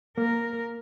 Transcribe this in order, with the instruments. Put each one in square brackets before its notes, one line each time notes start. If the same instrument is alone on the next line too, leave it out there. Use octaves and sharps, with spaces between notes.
[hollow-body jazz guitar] A#3 [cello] A#4